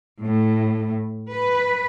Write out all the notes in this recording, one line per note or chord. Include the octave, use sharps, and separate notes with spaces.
A2
B4